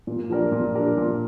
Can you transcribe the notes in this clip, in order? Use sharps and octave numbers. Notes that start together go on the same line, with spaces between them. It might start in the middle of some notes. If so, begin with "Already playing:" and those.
A#2
F3 D4 A#4 D5
A#2
F3 D4 A#4 D5
A#2